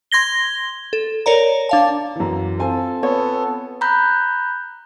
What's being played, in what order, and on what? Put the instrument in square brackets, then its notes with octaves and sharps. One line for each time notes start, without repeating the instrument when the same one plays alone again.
[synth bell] C6 G#6 A#6 G7
A4
A#4 C#5 D5 A#5
D4 F5 A5
[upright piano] F#2 E3
[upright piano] C4 F4 G#5 [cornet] A4
[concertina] B3 [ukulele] C#5
[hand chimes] A#5 B5 F#6 G6